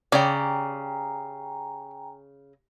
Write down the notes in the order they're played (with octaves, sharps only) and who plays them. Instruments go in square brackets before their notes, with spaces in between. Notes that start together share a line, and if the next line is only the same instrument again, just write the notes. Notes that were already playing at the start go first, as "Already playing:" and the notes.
[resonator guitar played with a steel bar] C#3 [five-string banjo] G4 D5 [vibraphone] G5 G#5 A#5